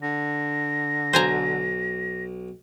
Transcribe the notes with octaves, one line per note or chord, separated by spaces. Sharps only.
D3 A#6
B1 C5 G#5 A#5